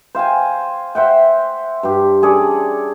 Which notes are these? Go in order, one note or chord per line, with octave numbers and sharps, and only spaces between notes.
C5 F5 G5 G#5
C5 E5 F#5 G5
G2 G4
C#4 G#4 A4 D5